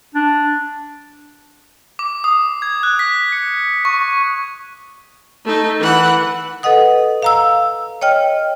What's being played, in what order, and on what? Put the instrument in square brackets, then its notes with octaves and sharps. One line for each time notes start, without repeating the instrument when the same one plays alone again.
[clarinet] D4
[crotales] D6
D#6
G#6
F#6
B6
C#7
C#6
[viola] A3 D#4
E3 F#5
[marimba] A4 B4 D#5 F#5 D#6
F5 A#5 E6
C#5 D#5 G5 F6